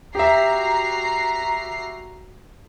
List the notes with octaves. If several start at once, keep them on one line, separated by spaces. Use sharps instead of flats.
F#4 G4 E5 A#5 C7